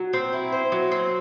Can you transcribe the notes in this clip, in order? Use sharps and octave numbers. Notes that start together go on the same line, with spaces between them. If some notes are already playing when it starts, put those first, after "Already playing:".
Already playing: F#3
C4
E4
C5
F#3
C4